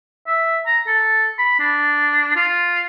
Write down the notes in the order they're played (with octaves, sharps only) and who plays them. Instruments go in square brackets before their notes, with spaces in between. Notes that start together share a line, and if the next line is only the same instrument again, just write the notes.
[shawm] E5
A#5
A4
B5
D4
F4